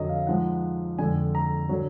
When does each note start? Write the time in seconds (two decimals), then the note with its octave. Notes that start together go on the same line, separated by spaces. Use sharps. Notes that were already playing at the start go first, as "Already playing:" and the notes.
Already playing: F2 D3 F#3 D#5
0.09 F5
0.27 G#2 F3 G#3 F#5
0.99 F2 D3 G#3 G#5
1.35 A#5
1.69 D3 F#3